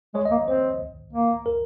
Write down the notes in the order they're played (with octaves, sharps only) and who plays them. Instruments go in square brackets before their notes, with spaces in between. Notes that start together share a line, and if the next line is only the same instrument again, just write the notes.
[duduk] G#3 [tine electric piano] C#5
[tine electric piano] D#5
[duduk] A#3
[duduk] C4 [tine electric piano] C5
[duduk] A#3
[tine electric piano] A#4